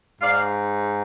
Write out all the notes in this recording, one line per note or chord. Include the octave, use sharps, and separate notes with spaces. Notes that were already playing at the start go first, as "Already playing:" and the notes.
G#2 D5 F5